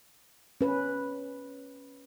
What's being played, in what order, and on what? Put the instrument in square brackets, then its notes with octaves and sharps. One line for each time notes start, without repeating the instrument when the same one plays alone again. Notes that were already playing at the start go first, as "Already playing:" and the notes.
[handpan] C#4 B4